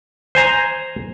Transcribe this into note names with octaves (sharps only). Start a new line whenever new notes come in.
C5 G#5 A#5